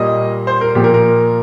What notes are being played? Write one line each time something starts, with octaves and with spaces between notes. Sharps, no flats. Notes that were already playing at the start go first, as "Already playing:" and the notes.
Already playing: A#2 G3 A#3 D#5
C5
A#4
A#2 F3 A#3 G4
A#4
A#4